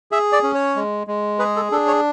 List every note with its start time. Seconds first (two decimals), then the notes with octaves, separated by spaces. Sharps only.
0.11 G#4 E5
0.32 D5
0.43 C#4
0.55 C#5
0.76 G#3
1.07 G#3
1.39 G#4 B4
1.56 A4
1.71 D4 A4
1.87 C#5